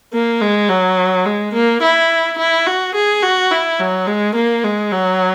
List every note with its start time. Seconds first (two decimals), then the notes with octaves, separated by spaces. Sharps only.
0.13 A#3
0.41 G#3
0.69 F#3
1.26 G#3
1.54 A#3
1.82 E4
2.39 E4
2.67 F#4
2.95 G#4
3.23 F#4
3.51 E4
3.79 F#3
4.08 G#3
4.35 A#3
4.64 G#3
4.92 F#3